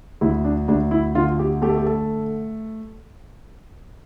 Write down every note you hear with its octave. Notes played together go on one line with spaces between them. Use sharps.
D2 E4
D4
D2 D4
E4
D3 F4
G4
A3 G4
A4
G4
A4